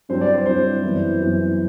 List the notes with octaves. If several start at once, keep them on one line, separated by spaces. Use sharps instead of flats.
G2 F#3 C4 E4 C5
D5
C5
G2 F#3 C4 E4 C5
F#2 E3 B3 E4
F#2 E3 B3 E4